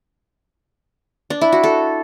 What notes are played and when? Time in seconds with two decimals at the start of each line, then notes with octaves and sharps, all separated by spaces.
1.30 D4
1.41 E4
1.52 F#4
1.64 A4